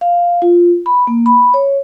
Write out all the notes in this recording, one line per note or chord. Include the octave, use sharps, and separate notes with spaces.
F5
F4
B5
A#3
B5
C#5